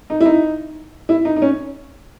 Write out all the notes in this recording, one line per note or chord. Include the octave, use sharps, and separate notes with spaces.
D#4
E4
D#4
E4
D#4
D#4
C#4